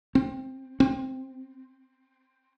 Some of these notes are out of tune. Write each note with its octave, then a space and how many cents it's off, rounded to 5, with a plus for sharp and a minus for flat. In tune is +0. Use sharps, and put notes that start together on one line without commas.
C4 +10
C4 +5